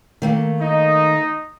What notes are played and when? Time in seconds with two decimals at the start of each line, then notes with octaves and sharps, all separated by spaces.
0.22 D#3 A3 A#3
0.61 D#4